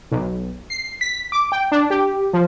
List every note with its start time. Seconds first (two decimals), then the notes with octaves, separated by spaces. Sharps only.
0.11 B1
0.70 C7
1.01 B6
1.32 D6
1.52 G5
1.72 D4
1.90 G4
2.33 F3